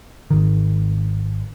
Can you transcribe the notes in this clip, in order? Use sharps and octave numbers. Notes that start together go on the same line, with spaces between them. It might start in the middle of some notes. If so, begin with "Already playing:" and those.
G#1 D#3